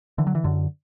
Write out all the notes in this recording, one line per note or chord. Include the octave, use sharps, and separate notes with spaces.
D3 E3
F#3
E3
F#2 D3